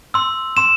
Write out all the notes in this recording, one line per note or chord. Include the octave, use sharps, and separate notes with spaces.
C6 E6
C6 E7